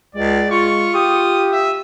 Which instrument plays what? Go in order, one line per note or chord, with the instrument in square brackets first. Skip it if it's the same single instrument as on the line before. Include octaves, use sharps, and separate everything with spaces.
[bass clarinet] C#2 [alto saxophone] G#3 [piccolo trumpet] D5
[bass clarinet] F4 [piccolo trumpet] C#6
[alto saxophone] G4 [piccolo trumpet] D#6
[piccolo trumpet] E5